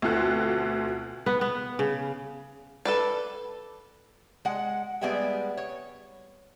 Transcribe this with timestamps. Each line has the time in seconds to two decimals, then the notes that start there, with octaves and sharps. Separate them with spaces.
0.02 D2 B2 C4 F4 A4 F#6
1.26 B3
1.41 B3
1.79 C#3
2.85 A4 B4 D5
4.45 G#3 F#5
5.01 G3 G#3 B3 G#4 E5 G5
5.57 C#5